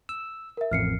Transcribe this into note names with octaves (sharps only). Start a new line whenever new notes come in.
E6
A#4 E5
A1 F2 F6 C7 C#7